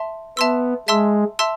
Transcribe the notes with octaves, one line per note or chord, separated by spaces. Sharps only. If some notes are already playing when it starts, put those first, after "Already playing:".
Already playing: E5 A5 C6
B3 E5 A5 C6 E6
G#3 E5 A5 C6 E6
E5 A5 C6 E6